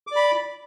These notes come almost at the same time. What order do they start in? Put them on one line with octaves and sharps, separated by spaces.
D6 D5 B5